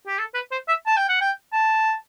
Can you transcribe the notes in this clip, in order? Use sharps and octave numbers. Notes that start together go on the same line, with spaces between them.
G4
A4
B4
C5
E5
A5
G5
F#5
G5
A5